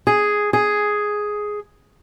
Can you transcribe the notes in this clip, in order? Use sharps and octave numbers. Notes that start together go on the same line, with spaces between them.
G#4
G#4